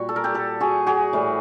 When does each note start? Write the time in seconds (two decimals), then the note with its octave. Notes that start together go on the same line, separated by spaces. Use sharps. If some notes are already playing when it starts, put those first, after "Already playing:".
Already playing: A#2 G3 F#4
0.09 A4
0.16 A#4
0.24 G4 A4
0.34 G4 A4
0.60 F#4 G#4
0.87 F#4 G#4
1.13 A2 E3 G3